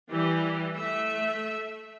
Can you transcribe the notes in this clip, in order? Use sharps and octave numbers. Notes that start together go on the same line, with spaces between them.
E3 G3 G4
A3 E5